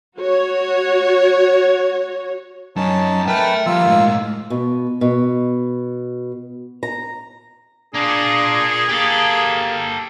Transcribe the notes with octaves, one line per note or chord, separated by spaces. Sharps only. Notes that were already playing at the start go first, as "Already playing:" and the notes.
F#4 C#5
F#2 C#4 D#4 A5
A#4 B4 E5 G5 A5
F3 G3 A#3 F4 E6
A2 G#3
B2
B2
A#5
A#3 D4 F4 G#4
A#3 G4 A4